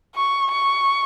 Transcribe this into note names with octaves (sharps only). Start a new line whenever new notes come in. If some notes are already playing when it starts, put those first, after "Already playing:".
C#6
C#6